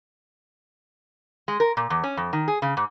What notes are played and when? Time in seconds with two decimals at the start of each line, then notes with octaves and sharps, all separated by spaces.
1.48 G#3
1.60 A#4
1.77 A#2
1.90 E2
2.04 C#4
2.17 F2
2.33 D#3
2.48 G#4
2.62 C#3
2.77 G#2